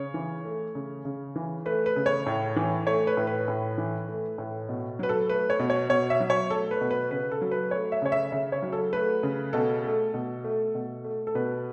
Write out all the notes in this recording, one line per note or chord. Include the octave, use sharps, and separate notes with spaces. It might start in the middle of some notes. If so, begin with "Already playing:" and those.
Already playing: C#3 C#5
E3
A3
C#3
C#3
E3
A3 B4
B4
C#3
C#5
A2
E3
A3 C#5
B4
A2
B4
A2
E3
A3
A2
B2
F#3 B4
A4
A3 B4
C#5
B2
C#5
B2 C#5
E5
F#3
C#5
A3 A4
B4
B2
B4
C#3 B4
A4
F#3
B4
A3 C#5
E5
C#3 C#5
E5
C#3 E5
C#5
F#3
A4
A3 B4
C#3
B2 A4
A3
B2
A3
B2
A3
A4
B2 B4